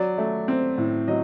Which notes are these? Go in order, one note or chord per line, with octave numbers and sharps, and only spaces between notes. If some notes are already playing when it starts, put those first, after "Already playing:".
Already playing: F#3 D5
A3
C4
A2
F#3 D#5